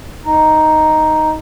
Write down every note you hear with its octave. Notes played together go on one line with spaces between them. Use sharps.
D#4